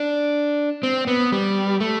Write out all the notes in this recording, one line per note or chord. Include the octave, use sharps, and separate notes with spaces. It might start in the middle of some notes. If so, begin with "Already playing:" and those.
Already playing: D4
C4
B3
G3
A3